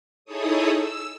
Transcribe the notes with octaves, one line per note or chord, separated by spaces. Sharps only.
D#4 E4 G#4 A4 C#5 D#6
E6